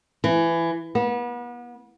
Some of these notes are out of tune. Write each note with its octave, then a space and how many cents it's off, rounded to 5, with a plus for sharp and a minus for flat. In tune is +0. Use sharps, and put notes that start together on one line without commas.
E3 +20
B3 -35